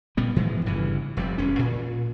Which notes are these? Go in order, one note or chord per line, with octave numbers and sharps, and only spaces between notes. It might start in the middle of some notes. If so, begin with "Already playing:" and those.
A#2 G3 B3
G#2 E3 F3 G#3
G1 G2 C#3 E3
F1 C3 G3
E1 C#4
A#2